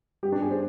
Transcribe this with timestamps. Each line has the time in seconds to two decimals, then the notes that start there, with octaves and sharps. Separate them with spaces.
0.23 G2 G4
0.32 D4
0.42 B3 G#4
0.51 C5